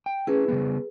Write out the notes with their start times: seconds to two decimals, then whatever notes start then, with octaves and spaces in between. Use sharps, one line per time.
0.06 G5
0.27 C#4 E4 G#4 B4
0.48 C#3 G3 B3